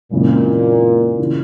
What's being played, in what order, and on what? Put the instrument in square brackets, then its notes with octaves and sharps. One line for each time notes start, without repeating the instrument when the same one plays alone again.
[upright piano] F#2 C#3 E3 G#3 C4 [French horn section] A#2
[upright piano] C#3 E3